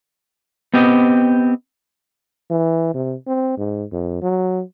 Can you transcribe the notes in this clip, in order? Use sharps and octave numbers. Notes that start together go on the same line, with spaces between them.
B3 C4 G4 D#5
E3
C3
C4
G#2
F2
F#3